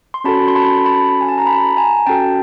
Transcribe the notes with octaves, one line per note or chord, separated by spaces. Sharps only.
C6
C#4 F#4 A4 A5 B5
C6
A5 B5
A5 B5
G#5
A5
A#5
A5 B5
G#5 A#5
C#4 F#4 A4 G5 A5